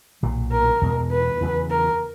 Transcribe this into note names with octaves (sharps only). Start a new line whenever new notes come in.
B1 A#2 F#3
A#4
E2 B2 G#3
B4
E2 C#3 F#3
A#4